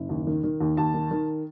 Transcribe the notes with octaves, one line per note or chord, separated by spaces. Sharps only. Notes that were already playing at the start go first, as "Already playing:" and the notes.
Already playing: F#1
D#2
D#3
D#3
D#2
D#2 A5
D#3
D#3